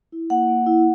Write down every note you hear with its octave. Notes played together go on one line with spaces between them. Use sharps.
E4
A#3 F#5
A#3
E4